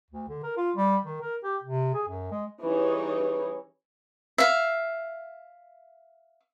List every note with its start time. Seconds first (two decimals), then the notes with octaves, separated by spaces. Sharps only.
0.11 D2
0.29 D3
0.43 A#4
0.57 F4
0.76 G3
1.05 D#3
1.22 A#4
1.44 G4
1.63 C3
1.94 G#4
2.08 F#2
2.31 G#3
2.63 E3 G3 C#4 D#4 G#4 C#5
4.38 E5 F5